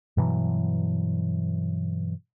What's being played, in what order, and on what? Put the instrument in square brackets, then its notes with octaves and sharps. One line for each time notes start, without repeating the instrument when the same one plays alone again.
[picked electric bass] G2 B2 E3 F#3